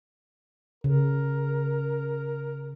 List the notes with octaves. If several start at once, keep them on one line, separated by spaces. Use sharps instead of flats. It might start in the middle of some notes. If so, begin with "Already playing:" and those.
C#3 A#4